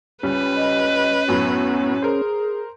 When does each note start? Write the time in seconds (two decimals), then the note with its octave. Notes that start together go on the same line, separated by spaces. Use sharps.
0.23 C#2 G3 C#4 B4
0.56 D#5
1.28 F#2 A2 F#3 B3
2.02 G#4 A#4 C5